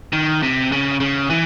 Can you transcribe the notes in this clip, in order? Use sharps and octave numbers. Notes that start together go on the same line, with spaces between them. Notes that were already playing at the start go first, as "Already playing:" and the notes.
D#3
C3
C#3
C#3
E3